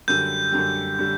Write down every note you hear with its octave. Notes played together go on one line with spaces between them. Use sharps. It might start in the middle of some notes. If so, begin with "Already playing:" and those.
F#2 D3 G3 G6
F#2 D3 G3
D3 G3